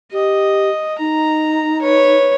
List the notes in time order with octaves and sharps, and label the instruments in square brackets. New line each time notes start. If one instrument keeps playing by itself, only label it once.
[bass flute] G4 [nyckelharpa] D#5
[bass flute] D#4 [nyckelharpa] A#5
[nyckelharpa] B4 C#5